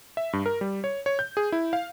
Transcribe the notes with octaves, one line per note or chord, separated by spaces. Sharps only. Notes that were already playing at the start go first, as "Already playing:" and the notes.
E5
G2
A#4
G3
C#5
C#5
G6
G#4
E4
F5